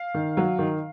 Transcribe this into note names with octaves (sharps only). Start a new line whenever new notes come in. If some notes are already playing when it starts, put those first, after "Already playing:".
Already playing: F5
D#3
F#3
D#3